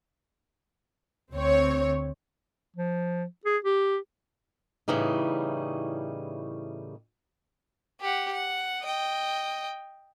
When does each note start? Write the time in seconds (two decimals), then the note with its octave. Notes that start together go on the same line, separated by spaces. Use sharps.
1.33 D2 C4 C#5
2.76 F3
3.46 G#4
3.65 G4
4.88 A2 C#3 E3 G3 D#4
8.01 G4 F#5
8.32 F#5
8.82 D#5 G5